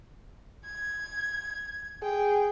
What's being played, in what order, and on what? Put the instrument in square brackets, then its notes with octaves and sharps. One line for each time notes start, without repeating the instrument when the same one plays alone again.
[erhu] G#6
[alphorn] G#4 [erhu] G5